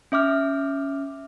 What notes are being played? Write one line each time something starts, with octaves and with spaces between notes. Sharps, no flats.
C#4 E5 D6 F6